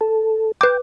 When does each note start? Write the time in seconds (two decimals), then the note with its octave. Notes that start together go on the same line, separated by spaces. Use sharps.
0.01 A4
0.61 B4 G5 D6